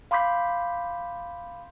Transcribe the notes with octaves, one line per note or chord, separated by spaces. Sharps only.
F5 B5 C6 D6 G6 B6